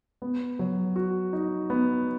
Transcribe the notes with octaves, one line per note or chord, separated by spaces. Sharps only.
B3
F#3
F#4
D#4
B3